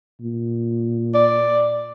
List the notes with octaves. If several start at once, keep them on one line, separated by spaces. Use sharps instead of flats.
A#2
D5